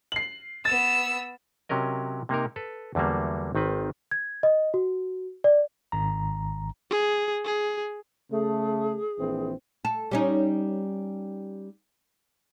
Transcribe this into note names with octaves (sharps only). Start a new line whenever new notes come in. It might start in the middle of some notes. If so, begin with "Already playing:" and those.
C7 F#7
B3 E6 A6 E7
C3 F#3 C#4 A#4 D#5
C3 A#3 D#4 A#4
A4 B4
E2 D3 F#3 G3 A#3
G#1 D#3 C4 B4
G#6
D#5
F#4
D5
G#1 A#5
G#4
G#4
C#3 A3 G#4
A#1 E3 C4
A4
G3 C#4 D#4